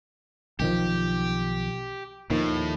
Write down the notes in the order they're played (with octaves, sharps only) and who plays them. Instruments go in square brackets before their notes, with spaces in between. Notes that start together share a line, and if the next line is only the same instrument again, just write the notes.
[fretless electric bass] B1 D#3 F3 [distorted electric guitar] G4
[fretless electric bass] D#2 D#3 F3 [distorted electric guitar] A2